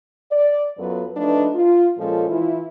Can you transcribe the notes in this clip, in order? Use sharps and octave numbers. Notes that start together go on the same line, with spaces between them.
D5
F#2 F#3 B3 F4 A4 B4
F3 A3 D4 D#4 B4
F4
A#2 F3 G#3 C#4 F4 A4
E3 E4 F4